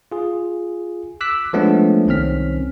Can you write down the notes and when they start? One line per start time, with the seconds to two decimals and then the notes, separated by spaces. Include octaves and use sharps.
0.12 F4 G#4
1.21 D6 E6 F#6 B6
1.53 F3 G#3 A3 B3 C#4 D4
2.07 C2 D#3 C4 C#4 F6 B6